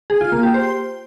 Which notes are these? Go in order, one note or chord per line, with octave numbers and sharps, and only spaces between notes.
G#4
F4
A#3
G4
C5